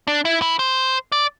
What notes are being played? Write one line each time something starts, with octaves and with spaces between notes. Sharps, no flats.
D4
E4
E4
C5
D5